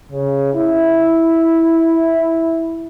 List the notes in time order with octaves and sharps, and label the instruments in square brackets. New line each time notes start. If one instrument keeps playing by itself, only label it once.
[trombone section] C#3
E4